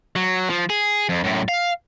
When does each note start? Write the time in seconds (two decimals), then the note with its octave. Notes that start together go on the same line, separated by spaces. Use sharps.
0.16 F#3
0.50 F3
0.70 G#4
1.09 F2
1.24 F#2 A2
1.48 F5